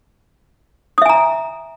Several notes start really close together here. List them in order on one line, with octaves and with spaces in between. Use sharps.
D#6 E5 G#5 A#5